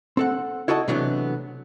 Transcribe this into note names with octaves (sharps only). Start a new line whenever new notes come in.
C4 A4 F#5
E4 F#4 A4 D#5 A5
C3 E3 F#3 A3 B3 D4